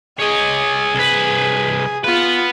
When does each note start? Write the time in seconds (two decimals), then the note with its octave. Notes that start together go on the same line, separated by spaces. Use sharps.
0.20 G#4 C#5 D#5
0.95 C2 B4
2.04 B3 F4 B4